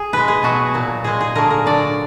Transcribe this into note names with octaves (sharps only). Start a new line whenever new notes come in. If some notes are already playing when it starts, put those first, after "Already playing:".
Already playing: G#4
B2 G#3 B4
G#4
B2 F#3 F#4
A#2 F#3
A#2 G#3 G#4
G#4
D3 F#3 A#4
A#4
D3 F#3 D5